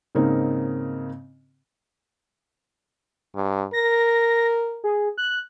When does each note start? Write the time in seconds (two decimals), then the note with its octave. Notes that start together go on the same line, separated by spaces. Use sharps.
0.15 G#2 C#3 A#3 C4 D#4
3.36 G2
3.73 A#4 A#6
4.84 G#4
5.18 F#6